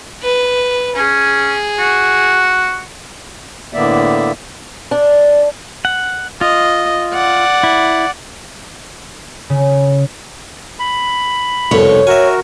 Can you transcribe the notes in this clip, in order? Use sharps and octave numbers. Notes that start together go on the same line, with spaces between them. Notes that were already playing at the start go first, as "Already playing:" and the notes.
B4
C#4 G#4
F#4
A2 D3 A#3 B3 D5 E5
D4
F#5
F4 D#5
D5 F#5
E4
C#3
B5
C2 F2 B2 C#5
F#4 A#4 E5 G#5